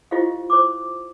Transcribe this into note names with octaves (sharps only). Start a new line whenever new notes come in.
E4 F4 G4 C5 D#5 F5
C5 D6